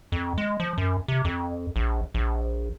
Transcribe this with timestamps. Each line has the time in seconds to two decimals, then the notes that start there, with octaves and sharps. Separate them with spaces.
0.12 F2
0.38 G#3
0.60 F3
0.78 F#2
1.08 C3
1.25 F2
1.76 A#1
2.14 A#1